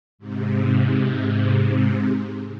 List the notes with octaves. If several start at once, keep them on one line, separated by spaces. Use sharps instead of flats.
G#2 C3